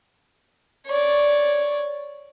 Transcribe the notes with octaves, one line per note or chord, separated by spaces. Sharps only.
C#5 D5